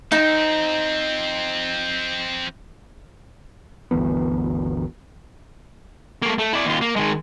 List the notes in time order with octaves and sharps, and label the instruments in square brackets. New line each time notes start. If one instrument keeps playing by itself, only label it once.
[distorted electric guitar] F3 C4 [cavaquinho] D#4
[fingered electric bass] G1 D2 E3 B3
[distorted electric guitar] A3 A#3
A3
E4 D5
D#2 F4
A#3
D#3 G#3